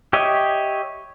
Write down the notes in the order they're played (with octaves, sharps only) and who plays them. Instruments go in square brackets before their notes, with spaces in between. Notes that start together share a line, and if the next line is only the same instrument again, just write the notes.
[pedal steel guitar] G4 C#5 D#5 E5